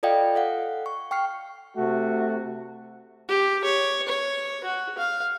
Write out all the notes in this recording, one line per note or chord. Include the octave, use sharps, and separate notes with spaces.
F4 A4 D5 D#5 F5 G5
A4 F5 F#5
C#6
G5 C#6 F6 C7
C3 A3 F#4
G4
C#5
C#5
F#4
F5